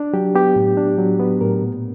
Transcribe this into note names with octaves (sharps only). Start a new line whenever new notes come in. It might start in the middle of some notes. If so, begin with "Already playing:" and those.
Already playing: D4
F#3 G4
B3 G4
A2
D4
F#3
B3
A2 A#4
A#2